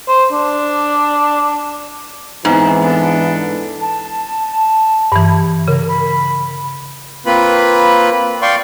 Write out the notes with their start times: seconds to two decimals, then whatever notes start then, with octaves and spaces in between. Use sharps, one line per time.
0.08 C5
0.32 D4
2.45 G#2 E3 B3 C4
2.80 B3 D4 A4
3.81 A5
5.12 G2 E3
5.68 C#3 A#4
5.88 B5
7.26 A#3 C4 F4 B4 B5
8.42 D5 F5 G5 C6 C#6